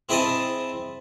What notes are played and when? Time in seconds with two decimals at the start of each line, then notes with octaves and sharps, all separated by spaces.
0.09 C4 E4 G#4 C5 D#5 A5